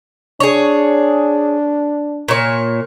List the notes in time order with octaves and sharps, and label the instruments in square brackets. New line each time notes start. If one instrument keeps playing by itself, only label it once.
[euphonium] D4 [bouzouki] G#4 C#5
[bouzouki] A#2 C#5